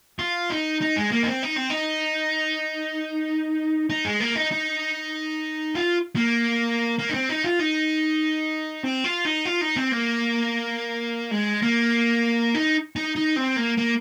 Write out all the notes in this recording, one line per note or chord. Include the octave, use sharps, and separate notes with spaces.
F4
D#4
D#4
G#3
A#3
D#4
C4
D#4
C4
D#4
D#4
G#3
A#3
D#4
D#4
F4
A#3
A#3
D#4
C4
D#4
F4
D#4
C4
F4
D#4
F4
D#4
C4
A#3
G#3
A#3
D#4
D#4
D#4
C4
A#3
A#3